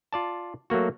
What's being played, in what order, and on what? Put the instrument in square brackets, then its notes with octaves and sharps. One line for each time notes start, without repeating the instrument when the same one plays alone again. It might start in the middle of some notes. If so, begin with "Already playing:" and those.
[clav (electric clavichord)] F4 D5 A5
F#3 A3 A#3 F#4